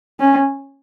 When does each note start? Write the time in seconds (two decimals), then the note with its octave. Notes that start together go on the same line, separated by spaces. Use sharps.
0.20 C#4